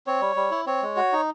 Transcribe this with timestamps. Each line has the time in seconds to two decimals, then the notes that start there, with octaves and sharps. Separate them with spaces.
0.07 C4 C#5
0.21 G3
0.36 G3
0.51 E4
0.66 C4 C#5
0.82 G#3
0.97 F#4
1.12 D#4